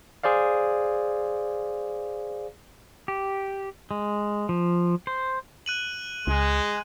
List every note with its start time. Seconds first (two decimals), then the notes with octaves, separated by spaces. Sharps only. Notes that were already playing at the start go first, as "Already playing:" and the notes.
0.23 G#4 C5 D5 F5
3.08 G4
3.91 G#3
4.49 F3
5.07 C5
5.66 F#6 D#7 F#7
6.27 C#2 G#3